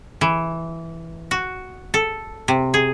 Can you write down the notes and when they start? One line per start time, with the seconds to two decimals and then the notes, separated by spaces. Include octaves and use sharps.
0.21 E3
1.31 F#4
1.94 A4
2.48 C3
2.74 G#4